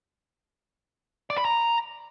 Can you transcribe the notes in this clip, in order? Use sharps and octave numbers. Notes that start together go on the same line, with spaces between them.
D5
B5
A#5